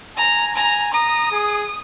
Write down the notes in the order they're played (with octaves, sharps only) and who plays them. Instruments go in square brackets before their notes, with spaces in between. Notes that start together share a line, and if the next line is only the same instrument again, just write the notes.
[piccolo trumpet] G#5 [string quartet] A#5
[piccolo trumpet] G#5 [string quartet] A#5
[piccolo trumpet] A#5 [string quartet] D#6
[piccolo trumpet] G#4